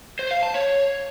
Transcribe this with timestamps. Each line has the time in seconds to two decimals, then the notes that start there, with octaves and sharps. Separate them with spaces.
0.19 C5
0.31 F5
0.43 A5
0.54 C#5